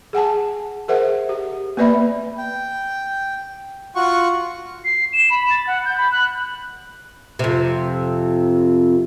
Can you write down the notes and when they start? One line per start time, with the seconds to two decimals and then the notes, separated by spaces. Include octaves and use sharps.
0.13 G#4 F#5 G#5 A5
0.88 G#4 A#4 C5 E5 F#5
1.29 G4
1.77 A#3 B3 B4 D5 E5 B5
2.38 G5
3.96 F4 F#4 F#5 C#6
4.84 C7
5.13 E7
5.30 B5
5.50 A6
5.67 F#5
5.85 G6
5.97 B5
6.11 F#6
7.39 F2 C3